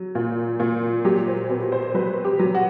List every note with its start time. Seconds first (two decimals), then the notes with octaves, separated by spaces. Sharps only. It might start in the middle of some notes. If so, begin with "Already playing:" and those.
Already playing: F#3
0.15 A#2
0.60 A#2
1.05 F#3 G4
1.27 C5
1.50 B2 B4
1.72 C5
1.94 F#3 B4
2.25 G4
2.39 F#3
2.55 F#4